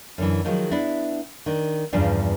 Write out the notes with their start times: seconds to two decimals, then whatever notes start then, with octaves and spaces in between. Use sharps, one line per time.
0.18 F#2 D3 E3
0.45 D#3 F3 F#3 G#3
0.71 B3 D4 E4
1.46 D#3 D4
1.93 E2 G2 C#3 F3 D4